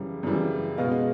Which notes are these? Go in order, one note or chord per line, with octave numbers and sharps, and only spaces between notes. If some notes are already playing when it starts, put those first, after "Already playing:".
Already playing: F#2 C#3 E3 G3
F#2 C#3 E3 G3
B2 G#3 B3 D#5 F5